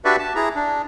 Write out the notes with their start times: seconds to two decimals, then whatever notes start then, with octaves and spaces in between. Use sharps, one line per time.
0.05 D4 F#4 G4 B4 D5 E5
0.19 A5
0.36 E4 G#4 A#5
0.55 D4